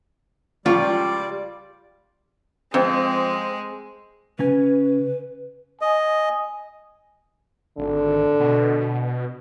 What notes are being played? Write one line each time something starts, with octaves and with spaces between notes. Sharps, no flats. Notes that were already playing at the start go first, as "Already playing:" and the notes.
C#2 F3 G3 F4 D5 C#6
F2 G#3 C4
C#3 C#4 B4 G#5
D#5 G#5
G#1 D3
B2